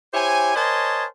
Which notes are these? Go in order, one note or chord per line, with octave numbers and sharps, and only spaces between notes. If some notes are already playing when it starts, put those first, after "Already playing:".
E4 G4 C5 C#5 G#5
A#4 C5 C#5 D#5 G#5 A5